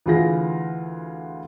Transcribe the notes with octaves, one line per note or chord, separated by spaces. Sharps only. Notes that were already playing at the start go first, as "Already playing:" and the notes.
D2 E3 F4 G#4 A#6